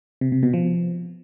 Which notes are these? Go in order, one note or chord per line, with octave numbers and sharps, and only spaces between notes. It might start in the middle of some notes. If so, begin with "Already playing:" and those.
C3
C3
B2
F3